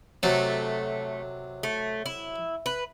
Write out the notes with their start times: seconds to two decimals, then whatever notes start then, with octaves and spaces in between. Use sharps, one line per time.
0.23 C3 F#3 A3
1.63 A3
2.06 E4
2.66 B4